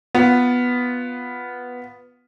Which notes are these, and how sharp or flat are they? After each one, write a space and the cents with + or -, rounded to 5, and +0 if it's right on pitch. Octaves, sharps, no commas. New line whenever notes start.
B3 +0 F4 +5